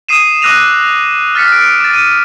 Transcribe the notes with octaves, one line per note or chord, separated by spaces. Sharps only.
D#6 C7 D#7 E7
D6 E6 F#6 A#6 D#7 F7
F6 A6 B6 C#7
D7
D6 A6
D#7